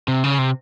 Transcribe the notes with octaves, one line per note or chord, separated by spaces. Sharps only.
C3
C#3
C3